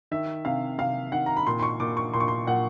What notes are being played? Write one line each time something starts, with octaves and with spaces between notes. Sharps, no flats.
D#3 E5
C3 F5
C3 F5
D#3 F#5
A#5
B5
A#2 C6
C6
C#6
A#2 D6
C#6
A#2 C6
C#6
C6
A#2 F#5